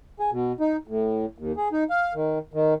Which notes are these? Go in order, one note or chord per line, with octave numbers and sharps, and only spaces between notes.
G#4
B2
D#4
A2
D#2
G#4
D#4
F5
D#3
D#3